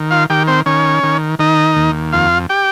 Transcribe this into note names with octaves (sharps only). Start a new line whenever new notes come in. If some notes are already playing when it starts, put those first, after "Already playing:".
Already playing: D#3
F4 F5
D#3 G4 G5
C4 C5
D#3 C#4 C#5
D#3
D#3 D#4 D#5
D#2
F2 F4 F5
G4 G5